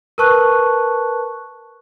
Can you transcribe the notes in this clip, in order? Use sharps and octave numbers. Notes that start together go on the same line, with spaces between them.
A#4 B4 A5 C#6 F#6